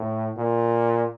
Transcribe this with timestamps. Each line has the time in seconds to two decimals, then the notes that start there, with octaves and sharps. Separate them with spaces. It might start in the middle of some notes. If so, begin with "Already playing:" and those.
Already playing: A2
0.37 A#2